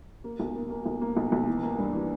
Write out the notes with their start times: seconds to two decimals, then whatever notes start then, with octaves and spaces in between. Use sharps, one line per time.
0.24 A#3
0.40 B1
0.55 A#3
0.70 A#3
0.86 B1
1.01 A#3
1.17 B1
1.32 B1
1.47 E3
1.63 A#3
1.79 G2
1.93 E3